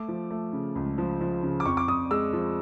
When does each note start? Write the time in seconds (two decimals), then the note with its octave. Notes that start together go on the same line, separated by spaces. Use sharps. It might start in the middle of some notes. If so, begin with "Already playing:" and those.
Already playing: A3 D6
0.08 F3
0.31 A3
0.53 C#3
0.75 C#2
0.98 F3
1.21 F3
1.43 C#3
1.60 D6
1.65 F2 C#6
1.77 D6
1.88 F2 D#6
2.11 G#3 E6
2.33 F3